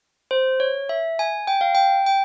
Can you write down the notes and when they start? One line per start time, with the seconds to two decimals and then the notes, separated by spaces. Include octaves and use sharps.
0.31 C5
0.60 C#5
0.89 E5
1.19 G#5
1.47 G5
1.61 F5
1.75 G5
2.06 G5